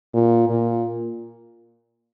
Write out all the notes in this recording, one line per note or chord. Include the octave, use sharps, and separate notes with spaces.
A#2
A#2